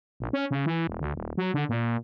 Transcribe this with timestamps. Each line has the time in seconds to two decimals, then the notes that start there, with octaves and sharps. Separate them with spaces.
0.20 A#1
0.33 C#4
0.51 C#3
0.66 E3
0.87 E1
1.00 D2
1.15 D#1
1.37 F#3
1.54 D3
1.69 A#2